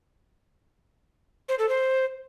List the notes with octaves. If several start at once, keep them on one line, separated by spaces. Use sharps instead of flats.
C5
A4
C5